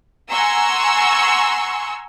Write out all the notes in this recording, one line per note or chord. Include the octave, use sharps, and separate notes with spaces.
F#5 G#5 A#5 C6 C#6 E6